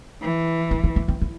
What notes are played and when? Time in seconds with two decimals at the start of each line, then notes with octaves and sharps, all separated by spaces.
0.22 E3
0.71 D4
0.84 E4
0.96 D4
1.08 C4
1.22 E4